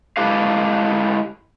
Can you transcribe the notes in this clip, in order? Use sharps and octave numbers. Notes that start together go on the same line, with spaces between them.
G#3 E4 G4 A4 B4 F5